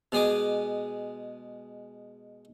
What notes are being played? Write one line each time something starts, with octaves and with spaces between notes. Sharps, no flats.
B2 G#3 G#4 D#5 D6